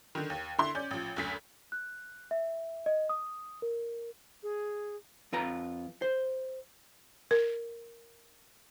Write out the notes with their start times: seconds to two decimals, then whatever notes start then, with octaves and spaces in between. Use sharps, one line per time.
0.15 D3 D#3
0.30 D#2
0.58 D3 E4 C6
0.75 C#4 D5 G6
0.91 A1 F3
1.16 F#1 D2 B6
1.72 F#6
2.31 E5
2.86 D#5
3.09 D#6
3.62 A#4
4.43 G#4
5.33 F2 F4 B4 A#5
6.02 C5
7.31 A#4